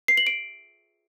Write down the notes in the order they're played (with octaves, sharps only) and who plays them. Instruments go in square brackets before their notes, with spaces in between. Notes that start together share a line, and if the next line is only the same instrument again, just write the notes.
[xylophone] C7
F#7
D7